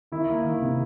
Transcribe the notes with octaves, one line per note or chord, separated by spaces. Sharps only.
D#3 E4
A#3
D#3
C3